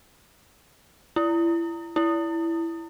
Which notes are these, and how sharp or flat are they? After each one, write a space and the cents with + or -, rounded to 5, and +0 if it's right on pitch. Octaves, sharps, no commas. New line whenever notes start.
E4 +30
E4 +10